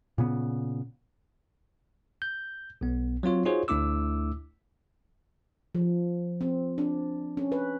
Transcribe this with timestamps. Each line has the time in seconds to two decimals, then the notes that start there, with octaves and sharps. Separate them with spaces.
0.18 A#2 C#3 B3
2.22 G6
2.81 B1 B3
3.23 F#3 C4 F4 C#5
3.45 D#4 F4 F#4 G#4 C5 C#5
3.68 D2 A3 D4 E4 D6 E6
5.75 F3
6.41 C4
6.78 D4
7.37 C#4
7.52 B4